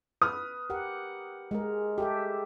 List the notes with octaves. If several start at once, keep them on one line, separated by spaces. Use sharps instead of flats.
B4 D#6 F6
G4 A#4 F#5
G#3 G#4 A#4
G4 A4 E5